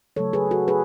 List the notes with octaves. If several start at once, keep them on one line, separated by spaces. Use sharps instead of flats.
C#3 F#3 A3 A4 C#5
G#4 B4
F#4 A4
G#4 B4